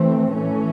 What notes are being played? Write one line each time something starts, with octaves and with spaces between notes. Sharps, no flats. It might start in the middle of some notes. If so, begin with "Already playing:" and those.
Already playing: E3 A3 C4
A2 E3 A3 C#4